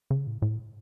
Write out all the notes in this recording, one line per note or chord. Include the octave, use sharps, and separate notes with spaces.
C#3
A2
A2